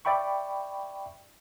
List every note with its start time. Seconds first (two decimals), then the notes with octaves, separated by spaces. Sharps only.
0.05 D5 E5 G5 B5 C#6